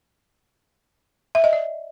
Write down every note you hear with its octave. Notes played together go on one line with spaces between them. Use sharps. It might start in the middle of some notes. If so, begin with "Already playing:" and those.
E5
D#5
D5